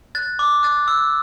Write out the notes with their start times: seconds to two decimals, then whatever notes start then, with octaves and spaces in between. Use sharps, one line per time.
0.15 F#6 A6
0.39 D6
0.63 F#6 A6
0.88 E6